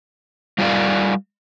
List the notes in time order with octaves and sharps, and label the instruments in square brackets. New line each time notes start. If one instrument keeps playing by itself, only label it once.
[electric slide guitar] G3 F4 G#4 A#4 D5 F5